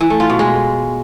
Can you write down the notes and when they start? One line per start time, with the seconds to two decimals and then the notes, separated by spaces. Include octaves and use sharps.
0.01 E3
0.10 A3
0.20 F4
0.30 B2
0.39 G#3